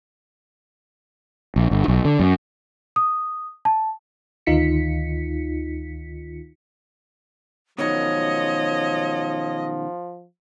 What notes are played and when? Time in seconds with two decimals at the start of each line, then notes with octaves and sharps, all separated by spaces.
1.56 A#1
1.71 G1
1.88 B1
2.05 D3
2.20 F#2
2.96 D#6
3.65 A5
4.46 D2 D#3 D#4 F4 B6 C#7
7.78 B2 D#3 F3 F#3 C#5 D#5